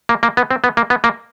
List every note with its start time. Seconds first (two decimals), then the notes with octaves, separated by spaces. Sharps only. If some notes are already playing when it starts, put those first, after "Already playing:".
0.09 A#3
0.23 A#3
0.37 B3
0.51 C4
0.64 B3
0.77 A#3
0.90 B3
1.04 A#3